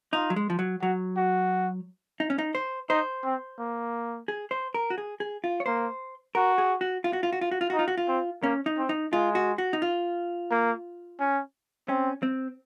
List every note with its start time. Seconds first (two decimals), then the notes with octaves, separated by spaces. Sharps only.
0.13 D#4 F4
0.30 F#3
0.36 G#3
0.50 F3
0.59 F#3
0.82 F#3 F#4
1.17 F#4
2.20 D#4
2.30 C#4
2.39 D#4
2.55 C5
2.89 D#4 C5
3.24 C4
3.59 A#3
4.28 G#4
4.51 C5
4.74 A#4
4.90 F#4
4.98 G#4
5.20 G#4
5.44 F4
5.60 C#5
5.66 A#3 C5
6.35 F#4 A#4
6.58 G#4
6.81 F#4
7.04 F4
7.13 F#4
7.23 F4
7.33 F#4
7.41 F4
7.51 F#4
7.61 F4
7.70 F#4
7.74 D#4
7.79 F4
7.88 F#4
7.98 F4
8.08 C4
8.43 A#3 C#4
8.66 D#4
8.78 C4
8.89 D#4
9.12 G#3 F4
9.35 F#4
9.58 F#4
9.73 D#4
9.82 F4
10.51 A#3
11.20 C#4
11.88 C4 C#4
12.23 C4